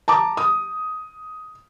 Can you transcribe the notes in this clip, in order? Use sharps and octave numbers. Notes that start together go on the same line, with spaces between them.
A5 A#5 D6
D#6